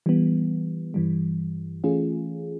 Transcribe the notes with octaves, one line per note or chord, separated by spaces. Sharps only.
E3 G3 B3
G2 E3 G3
E3 A3 C#4 F4 G#4